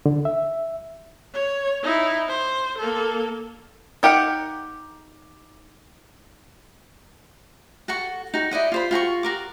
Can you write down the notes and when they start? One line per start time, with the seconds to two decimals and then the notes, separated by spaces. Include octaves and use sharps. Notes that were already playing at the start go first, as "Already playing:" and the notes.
0.06 D3
0.25 E5
1.34 C#5
1.83 D#4 E4
2.29 C5
2.78 A#3 A4
4.03 D#4 G4 A#4 F#5
7.88 F#4 A4 F#5 C#6
8.34 D#4 F#4
8.51 E4 D5 D#5 F#5
8.72 F4 C5 B5
8.91 F4 F#4 G#5 C#6
9.23 F#4 A#4 D6